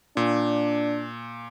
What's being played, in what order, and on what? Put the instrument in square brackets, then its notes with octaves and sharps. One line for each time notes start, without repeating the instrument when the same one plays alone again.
[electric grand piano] A#2 [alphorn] D4